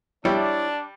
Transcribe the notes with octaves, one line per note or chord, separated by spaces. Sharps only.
G3 D4 E4 C#5 D5 A5